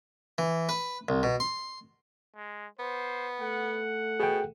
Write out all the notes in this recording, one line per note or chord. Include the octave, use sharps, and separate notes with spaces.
E3
B4
C2
B2
C6
G#3
B3 C5
A3 F#5
B2 G#4 G5